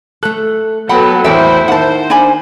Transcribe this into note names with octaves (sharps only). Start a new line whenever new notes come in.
A3 A4 F#6
F#3 B3 A4 F#5 G5 B5
E2 A2 E4 A4 A#4 C5 E5 G5
D#3 C5 F#5 A5
D4 G#5 B5